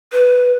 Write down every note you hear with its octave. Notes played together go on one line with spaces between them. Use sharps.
B4